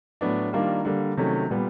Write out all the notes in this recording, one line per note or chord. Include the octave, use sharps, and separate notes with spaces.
A2 F#3 B3 D4
D#3 G3 A#3 D4 F4
D3 G3 A#3
C3 D#3 F#3 A3 C#4
A#2 G3 B3